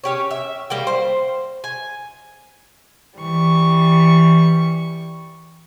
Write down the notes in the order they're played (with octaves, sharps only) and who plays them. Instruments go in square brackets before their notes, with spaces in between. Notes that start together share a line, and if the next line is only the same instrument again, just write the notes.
[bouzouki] C#4 G4 C#5
E5
G3 A#3 G5
C5
G#5
[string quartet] E3 G3 C#6